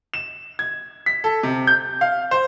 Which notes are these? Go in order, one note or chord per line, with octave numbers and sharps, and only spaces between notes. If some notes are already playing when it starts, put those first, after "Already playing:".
E7
G#6
B6
A4
C3
G6
F5
C5